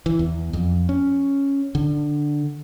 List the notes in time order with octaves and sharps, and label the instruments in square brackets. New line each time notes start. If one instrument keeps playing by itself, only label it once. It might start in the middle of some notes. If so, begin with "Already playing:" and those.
[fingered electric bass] E3
E2
F2
C#4
D3